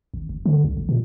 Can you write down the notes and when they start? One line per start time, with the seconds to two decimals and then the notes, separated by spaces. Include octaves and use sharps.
0.14 G#1
0.29 F#1
0.46 D3
0.64 C2
0.77 A1
0.89 A#2